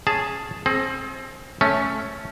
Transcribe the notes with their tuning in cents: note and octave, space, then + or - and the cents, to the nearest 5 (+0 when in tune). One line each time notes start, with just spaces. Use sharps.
C#4 +0 G#4 +0 A5 +0
C4 +25 G#4 +40
A3 +0 C#4 +0